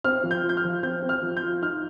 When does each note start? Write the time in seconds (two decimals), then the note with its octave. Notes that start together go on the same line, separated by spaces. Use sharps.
0.04 C4 F6
0.23 F3
0.31 G6
0.44 F4
0.49 G6
0.57 F6
0.64 F3
0.83 C4 G6
1.02 C4
1.09 F6
1.23 F3
1.37 G6
1.43 F4
1.62 D#4 F6